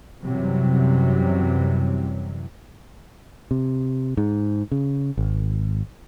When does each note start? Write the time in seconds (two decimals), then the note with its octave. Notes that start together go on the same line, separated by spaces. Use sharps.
0.23 F#2 C3 E3 F#3 G3
3.51 C3
4.17 G#2
4.71 C#3
5.17 G#1